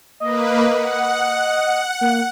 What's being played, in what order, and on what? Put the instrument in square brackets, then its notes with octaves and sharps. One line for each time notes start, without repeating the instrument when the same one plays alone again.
[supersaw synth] A#3 B4 [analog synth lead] D#5
[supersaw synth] F#5
[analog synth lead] A#3